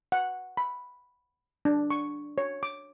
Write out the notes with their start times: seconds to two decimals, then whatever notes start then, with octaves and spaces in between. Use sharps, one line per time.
0.12 F#5
0.57 B5
1.65 D4
1.90 C#6
2.38 C#5
2.63 D6